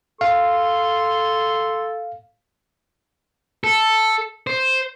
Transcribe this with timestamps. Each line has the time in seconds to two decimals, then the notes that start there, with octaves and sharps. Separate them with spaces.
0.21 A4 F5 C6
3.64 A4
4.47 C5